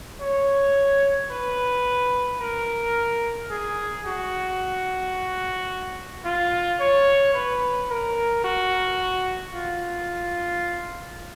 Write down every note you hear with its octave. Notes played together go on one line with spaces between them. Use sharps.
C#5
B4
A#4
G#4
F#4
F4
C#5
B4
A#4
F#4
F4